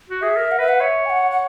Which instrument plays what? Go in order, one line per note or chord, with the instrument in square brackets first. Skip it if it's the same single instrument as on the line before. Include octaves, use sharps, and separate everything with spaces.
[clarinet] F#4
[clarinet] G#4 [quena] E5
[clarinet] A#4
[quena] F#5
[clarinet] B4 [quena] E5
[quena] F#5
[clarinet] C#5 [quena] E5
[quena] G#5
F#5
F#5